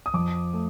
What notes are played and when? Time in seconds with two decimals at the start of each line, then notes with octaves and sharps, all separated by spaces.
0.06 D#6
0.14 F2 D6
0.53 A3